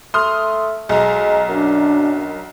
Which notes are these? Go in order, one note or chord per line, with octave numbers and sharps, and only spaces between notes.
A3 C6 D#6 F6
B1 G#3 A#5
F#2 D4